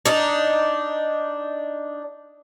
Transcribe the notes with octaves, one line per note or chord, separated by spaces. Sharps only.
D4 D#4